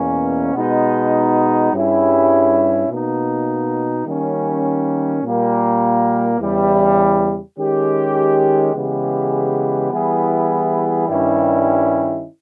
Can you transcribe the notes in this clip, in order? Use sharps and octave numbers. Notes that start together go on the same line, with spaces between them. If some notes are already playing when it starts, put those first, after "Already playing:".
Already playing: E2 B2 A#3 C#4
B2 G#3 B3 D#4
G2 G3 C#4 E4 G#4
B2 A#3 D#4
D#3 G3 A#3 C#4
A#2 G3 A#3
E2 C#3 E3 G3
D#3 G#3 C#4 G4
C#3 E3 G#3 B3 G4
E3 G3 B3 E4 G#4
G2 D#3 G3 C#4 E4